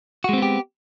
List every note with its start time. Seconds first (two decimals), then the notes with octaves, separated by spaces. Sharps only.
0.24 F#4
0.29 G#3
0.33 C4
0.38 B3
0.42 G4